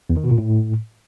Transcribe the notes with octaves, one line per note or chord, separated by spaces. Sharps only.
E2
D#3
B2
A#2
A2